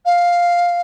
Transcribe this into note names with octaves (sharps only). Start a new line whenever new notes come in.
F5